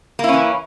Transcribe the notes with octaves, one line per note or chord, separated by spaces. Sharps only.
E3 A#3 C#4 E4